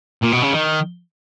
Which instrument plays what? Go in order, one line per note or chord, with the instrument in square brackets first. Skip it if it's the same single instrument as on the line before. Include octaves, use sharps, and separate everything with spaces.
[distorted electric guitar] A#2
B2
C#3
D#3